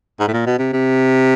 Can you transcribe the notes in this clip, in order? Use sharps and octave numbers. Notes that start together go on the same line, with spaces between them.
G#2
A2
A#2
B2
C3
C3